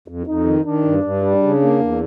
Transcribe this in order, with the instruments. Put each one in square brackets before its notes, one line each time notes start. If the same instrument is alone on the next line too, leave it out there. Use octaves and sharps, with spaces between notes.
[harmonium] F2
[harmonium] F2 [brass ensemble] D#4
[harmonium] D#3
[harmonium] D#3 [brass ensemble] D4
[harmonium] G2
G2
G3
C#3
A#3
E2